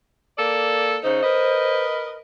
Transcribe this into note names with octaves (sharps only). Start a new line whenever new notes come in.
A#3 A4 D5
C#3 D#4 C5
A#4 B4 D#5